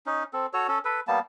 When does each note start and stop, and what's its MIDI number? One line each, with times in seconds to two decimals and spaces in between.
0.06 0.23 61
0.06 0.23 63
0.33 0.46 60
0.33 0.46 69
0.53 0.67 66
0.53 0.67 69
0.53 0.67 73
0.68 0.79 61
0.68 0.79 69
0.85 1.00 69
0.85 1.00 71
1.08 1.20 55
1.08 1.20 58
1.08 1.20 59
1.08 1.20 81